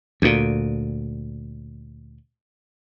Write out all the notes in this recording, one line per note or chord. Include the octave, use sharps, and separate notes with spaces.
D2 A#2